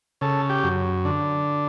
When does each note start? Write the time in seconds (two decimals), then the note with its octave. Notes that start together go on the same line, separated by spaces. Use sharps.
0.21 C#3 A4
0.49 G4
0.63 F#2
1.05 D3